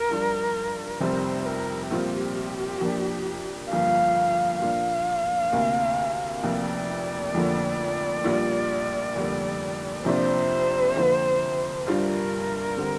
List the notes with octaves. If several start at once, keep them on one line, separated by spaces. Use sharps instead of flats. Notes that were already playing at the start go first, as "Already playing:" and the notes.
Already playing: A#4
G2 F3 D4 F4
F1 F2 C3 G3 C4 C5
A#4
A#1 A#2 G3 C4 F4 G4
F2 F3 A#3 D4
G1 F2 F3 A#3 F5
A#2 F3 A#3 D4 F5
D2 C3 A#3
F1 F2 C3 A#3 D5
F1 F2 D3 F3 A#3
A#1 A#2 G3 D4 F4
F1 F2 D3 G3 A#3
F2 C3 A#3 D4 F4 C5
F2 D3 A#3 F4
G1 G2 G3 D4 F4 A#4
D3 G3 C4